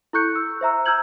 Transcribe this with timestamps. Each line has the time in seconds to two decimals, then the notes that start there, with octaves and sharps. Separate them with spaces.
0.13 E4 A4 C#6 F#6 G6 C#7
0.35 E6
0.61 C5 E5 A#5 E6
0.86 A#5 E6 F6 G6 G#6 F#7